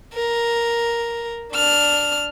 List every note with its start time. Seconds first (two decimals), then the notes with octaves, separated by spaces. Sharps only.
0.14 A#4
1.54 D4 F6